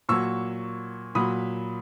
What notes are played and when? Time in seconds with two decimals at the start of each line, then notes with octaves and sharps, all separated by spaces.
0.09 A#2 F#3 C#6 E6
1.15 A#2 F#3 B5 D#6